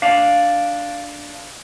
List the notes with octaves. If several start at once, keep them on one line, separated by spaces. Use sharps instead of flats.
D4 F5